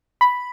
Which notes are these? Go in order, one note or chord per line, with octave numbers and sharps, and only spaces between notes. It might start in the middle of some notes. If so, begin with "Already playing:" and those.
B5